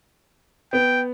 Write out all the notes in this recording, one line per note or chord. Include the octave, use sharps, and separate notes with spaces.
B3 G5